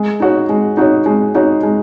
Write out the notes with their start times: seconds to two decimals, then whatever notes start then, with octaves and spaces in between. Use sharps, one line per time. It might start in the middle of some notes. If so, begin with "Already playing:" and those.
Already playing: G#3
0.20 D#4 F#4 C#5
0.49 G#3
0.77 D#4 F#4 C#5
1.06 G#3
1.35 D#4 F#4 C#5
1.63 G#3